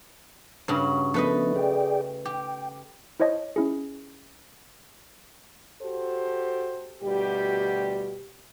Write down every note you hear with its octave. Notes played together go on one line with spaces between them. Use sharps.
G2 C#3 F#4
F3 A3 B3 D4 B4 D#5
G#4 D5 G5
G4 G5
E4 C5 C#5 D#5 A5
C#4 E4 G#4
F#4 G4 A4 C5
D2 B2 G3 G4